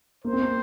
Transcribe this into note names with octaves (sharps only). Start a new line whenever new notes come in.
A#3 C5
C4
A#3